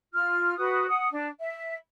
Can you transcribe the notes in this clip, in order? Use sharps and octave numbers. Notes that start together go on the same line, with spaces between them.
F4 F6
F#4 B4 D#6
F#5 D#6
D4
E5